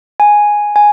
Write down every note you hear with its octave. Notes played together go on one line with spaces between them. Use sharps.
G#5
G#5